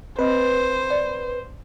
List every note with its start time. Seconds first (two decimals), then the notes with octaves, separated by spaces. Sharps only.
0.19 C4 B4 C5 D#5
0.90 D5